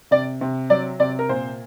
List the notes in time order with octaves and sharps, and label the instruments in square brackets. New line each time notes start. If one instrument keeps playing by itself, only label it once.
[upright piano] C3 D5
C3
F#3 D5
C3 D5
A#4
A#2 C5